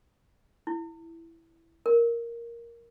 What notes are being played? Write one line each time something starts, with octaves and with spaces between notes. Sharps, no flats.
E4
A#4